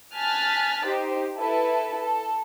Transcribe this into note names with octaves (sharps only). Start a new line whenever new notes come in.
G#5 A5 F6 F#6 A6 B6
D#4 G4 C5
E4 A4 B4 A5
A4